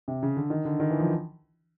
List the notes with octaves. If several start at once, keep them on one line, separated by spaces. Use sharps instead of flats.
C3
C#3
D3
D#3
D3
D#3
E3
F3